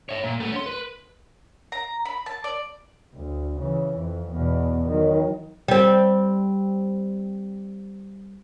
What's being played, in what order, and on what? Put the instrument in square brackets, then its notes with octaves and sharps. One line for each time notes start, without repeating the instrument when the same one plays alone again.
[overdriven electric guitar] C#5 E5
A#2
A3 B3
C#4 C6
B4
[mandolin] A#5
B5
A5
D5
[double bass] D2
C#3 E3
F2
E2 B2
D#3 F#3
[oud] G3 C4